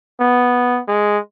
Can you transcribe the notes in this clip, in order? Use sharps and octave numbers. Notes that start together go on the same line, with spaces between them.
B3
G#3